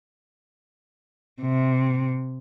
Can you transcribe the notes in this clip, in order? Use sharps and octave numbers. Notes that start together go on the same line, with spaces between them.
C3